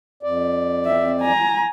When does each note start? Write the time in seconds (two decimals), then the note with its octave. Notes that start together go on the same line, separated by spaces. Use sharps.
0.23 F2 D5
0.86 C4 E5
1.21 G#5 A#5